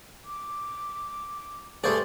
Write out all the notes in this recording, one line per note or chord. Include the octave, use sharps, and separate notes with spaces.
D6
G2 A3 G#4 C5 D5 C#6